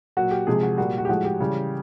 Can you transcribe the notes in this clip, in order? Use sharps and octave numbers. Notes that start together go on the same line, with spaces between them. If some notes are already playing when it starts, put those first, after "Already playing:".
A#2 F#3 F#4
G4
C3 F3 G#3 G#4
F#4
A#2 G3 F#4
F#4
G4
A2 F3 G#3 F#4
G4
C#3 E3 G3